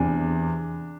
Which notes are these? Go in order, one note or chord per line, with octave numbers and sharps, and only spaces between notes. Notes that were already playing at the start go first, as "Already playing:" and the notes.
Already playing: E2 C3 E3 D4